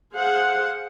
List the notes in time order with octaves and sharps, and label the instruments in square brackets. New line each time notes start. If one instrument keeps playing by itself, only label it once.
[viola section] G#4 C5 F5 F#5